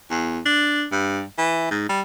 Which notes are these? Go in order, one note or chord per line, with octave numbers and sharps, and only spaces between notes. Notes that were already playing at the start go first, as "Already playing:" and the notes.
E2
D4
G2
E3
G#2
G3